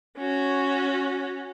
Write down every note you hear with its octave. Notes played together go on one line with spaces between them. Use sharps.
C#4 F#4